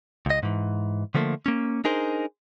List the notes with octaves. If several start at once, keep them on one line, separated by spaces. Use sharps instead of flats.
C#2 D#5
G#2 E3
D3 F3 A3 A#3
A#3 C#4
D4 D#4 G#4 A#4 C5